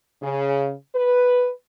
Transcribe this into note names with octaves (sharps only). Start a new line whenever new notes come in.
C#3
B4